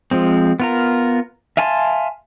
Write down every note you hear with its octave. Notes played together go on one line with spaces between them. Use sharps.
F3 G#3 C4
B3 F4 A#4
E5 F5 G#5 A5 C6